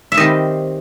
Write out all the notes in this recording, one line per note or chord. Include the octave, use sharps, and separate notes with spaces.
E5
D#3 G3 C4 D#5